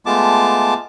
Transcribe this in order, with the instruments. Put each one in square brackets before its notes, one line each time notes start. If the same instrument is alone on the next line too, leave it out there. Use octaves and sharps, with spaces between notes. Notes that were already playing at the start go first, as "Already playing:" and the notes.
[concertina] G#3 A3 B3 F4 A5 D6